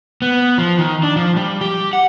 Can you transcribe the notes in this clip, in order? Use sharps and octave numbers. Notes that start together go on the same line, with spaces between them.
B3
F3
D#3
D4
F3
G3
G4
F#5